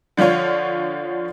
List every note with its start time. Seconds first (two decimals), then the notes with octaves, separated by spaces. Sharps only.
0.17 D3 F3 D4 F4 C#5